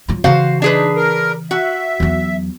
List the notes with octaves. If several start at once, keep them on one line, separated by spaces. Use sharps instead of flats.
F#3 F4
C#3 E3 F#4 C5 F5
D4 D#4 G#4 B4
A#4
F#4 E5
E2 F#3